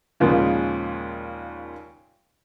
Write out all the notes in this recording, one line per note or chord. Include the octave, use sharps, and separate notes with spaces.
D#2 A#2 C#3 F3 G#3